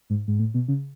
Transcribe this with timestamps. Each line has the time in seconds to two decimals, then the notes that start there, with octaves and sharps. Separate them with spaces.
0.10 G#2
0.28 G#2
0.39 A2
0.54 B2
0.68 C#3